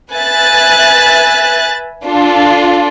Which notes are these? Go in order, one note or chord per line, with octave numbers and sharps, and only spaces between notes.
B4 E5 G#5 F#6 A6
D4 F4 A4